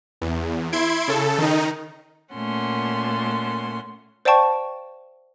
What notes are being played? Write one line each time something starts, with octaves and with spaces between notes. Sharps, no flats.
E2
E4 C6 G#6 D7
C#3 A4
D#3 D#4
A#2 A3 C#4 F#5 C6
C5 D5 F5 G5 A5 C#6